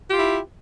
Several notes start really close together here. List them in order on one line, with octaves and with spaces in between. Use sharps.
G4 F4 E4